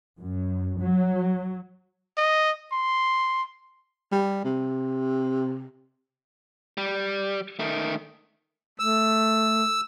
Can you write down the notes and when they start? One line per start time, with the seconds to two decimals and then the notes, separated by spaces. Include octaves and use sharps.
0.18 F#2
0.80 F#3
2.17 D#5
2.72 C6
4.12 G3
4.44 C3
6.78 G3
7.59 D#3 A3
8.79 A3 E6